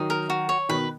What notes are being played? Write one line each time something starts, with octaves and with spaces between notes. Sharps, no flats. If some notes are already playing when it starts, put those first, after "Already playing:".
Already playing: D#3 F#3 D#4
A#4
F#4
C#5
B2 D#3 B4